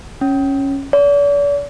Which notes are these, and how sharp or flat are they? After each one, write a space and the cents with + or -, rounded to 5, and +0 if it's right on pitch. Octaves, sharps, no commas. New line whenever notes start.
C#4 -10
D5 -45